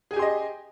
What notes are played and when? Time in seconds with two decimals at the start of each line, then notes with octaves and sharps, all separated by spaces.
0.11 G#4
0.14 G#5
0.16 G4
0.19 C6
0.22 D#5